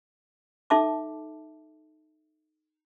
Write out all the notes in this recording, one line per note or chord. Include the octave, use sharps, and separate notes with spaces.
D#4 A4 E5 A5 D6